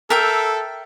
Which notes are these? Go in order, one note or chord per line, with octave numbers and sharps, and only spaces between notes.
A4 A#4 E5 G5